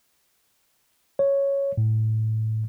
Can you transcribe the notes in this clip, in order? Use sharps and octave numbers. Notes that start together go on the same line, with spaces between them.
C#5
A2